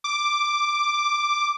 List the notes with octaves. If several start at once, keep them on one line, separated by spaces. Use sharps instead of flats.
D6